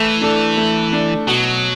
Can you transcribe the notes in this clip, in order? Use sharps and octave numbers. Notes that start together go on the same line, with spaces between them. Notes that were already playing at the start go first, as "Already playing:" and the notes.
Already playing: E3 A3
D4 A4
A3
D4 A4
B2 F#3